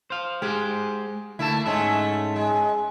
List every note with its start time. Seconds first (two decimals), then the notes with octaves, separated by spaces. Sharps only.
0.10 C5 F5
0.42 G#3 G4 G#4 C5
1.39 D2 A3 A#3 E4 A5
1.66 G#2 G#3 A3 C#4 E5
2.36 G#3